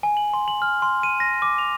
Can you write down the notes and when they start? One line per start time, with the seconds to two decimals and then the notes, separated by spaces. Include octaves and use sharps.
0.03 G#5
0.17 F#7
0.34 C6
0.48 F#7
0.62 F6
0.82 C6
1.03 D#7
1.20 A#6
1.42 D6
1.58 F7